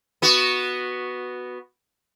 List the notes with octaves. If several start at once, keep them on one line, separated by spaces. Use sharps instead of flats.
B3 F#4